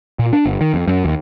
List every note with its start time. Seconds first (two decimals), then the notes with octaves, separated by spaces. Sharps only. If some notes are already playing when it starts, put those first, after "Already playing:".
0.19 A#2
0.33 D4
0.45 G1
0.61 D#3
0.74 F2
0.88 F#2
1.05 D#2